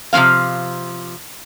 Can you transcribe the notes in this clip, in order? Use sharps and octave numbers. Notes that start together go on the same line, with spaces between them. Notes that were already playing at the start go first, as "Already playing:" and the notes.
C3 F3 G#3 C4 F5